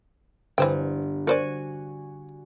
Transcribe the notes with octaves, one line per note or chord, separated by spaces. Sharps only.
G1 E3 C5 G5
F#4 A#4 C5 D5 G#5